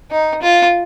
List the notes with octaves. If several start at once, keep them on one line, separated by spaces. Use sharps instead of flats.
D#4
F4